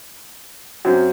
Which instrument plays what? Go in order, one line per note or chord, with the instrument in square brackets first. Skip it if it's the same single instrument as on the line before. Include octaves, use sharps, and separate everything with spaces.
[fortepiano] F#2 F#3 C4